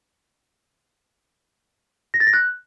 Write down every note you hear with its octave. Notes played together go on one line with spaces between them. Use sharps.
A#6
A6
A#6
F#6